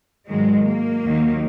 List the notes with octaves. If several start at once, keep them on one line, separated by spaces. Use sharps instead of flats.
G#2 D#3 F#3 G#3
A#3
D#2 D#3 F#3